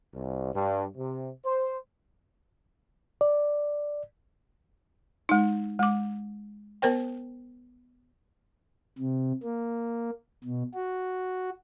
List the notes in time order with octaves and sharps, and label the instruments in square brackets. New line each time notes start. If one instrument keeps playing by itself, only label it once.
[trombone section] C2
G2
C3
C5
[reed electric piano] D5
[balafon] G#3 D#4
G#3 D6
B3 A#4 C5 G5
[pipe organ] C3
A#3
B2
F#4